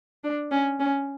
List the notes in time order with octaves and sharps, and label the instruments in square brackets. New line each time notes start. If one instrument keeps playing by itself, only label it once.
[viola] D4
C#4
C#4